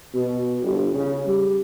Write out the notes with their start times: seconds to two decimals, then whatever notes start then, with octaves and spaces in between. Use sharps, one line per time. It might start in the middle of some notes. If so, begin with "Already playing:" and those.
0.14 B2
0.63 G1
0.94 C#3
1.27 G3